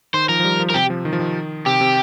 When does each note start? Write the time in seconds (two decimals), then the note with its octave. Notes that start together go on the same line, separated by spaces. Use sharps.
0.14 D#3 C5
0.29 F3 A#4
0.40 F3
0.44 G3
0.60 F3
0.70 A#4
0.74 C3 G4
0.90 F3
1.05 D#3
1.13 F3
1.20 D#3
1.66 C3 G4
1.81 C3